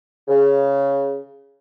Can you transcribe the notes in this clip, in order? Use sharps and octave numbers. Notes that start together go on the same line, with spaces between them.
C#3